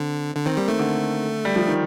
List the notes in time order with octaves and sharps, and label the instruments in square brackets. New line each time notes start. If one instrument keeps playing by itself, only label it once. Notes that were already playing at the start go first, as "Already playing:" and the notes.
Already playing: [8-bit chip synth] D3 [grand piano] C4
[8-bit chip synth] D3
[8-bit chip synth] D#3 [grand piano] C4
[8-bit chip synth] G3 [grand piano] A#3
[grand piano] D#3 [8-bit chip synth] A3
[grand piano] D3
G3
F3
D#3